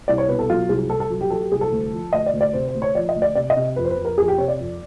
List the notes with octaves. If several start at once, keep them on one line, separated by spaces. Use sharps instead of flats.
C2 D5
C#5
B2 B4
A4
F#3 F4
C2 G#4
C2 A4
A4
F#3
G4
F#3 A4
G4
C2 G#4
A4
D2
F3
D2 D#5
D5
D2
D5
C3 C5
C5
D2
C#5
F3 D5
D#5
D2
D5
C3 D5
D#5
C3
F2 B4
C5
B4
F2
A#4
F2 G#4
G4
C3 C#5
D5
F2